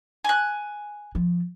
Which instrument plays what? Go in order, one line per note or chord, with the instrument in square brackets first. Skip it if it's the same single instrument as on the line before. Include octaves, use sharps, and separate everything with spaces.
[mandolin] G#5 F#6
[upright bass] F3